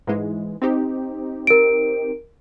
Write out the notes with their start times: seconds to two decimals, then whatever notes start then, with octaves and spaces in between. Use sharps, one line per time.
0.07 G#2 E3 G#3
0.62 C4 D#4 G4
1.47 A#4 D7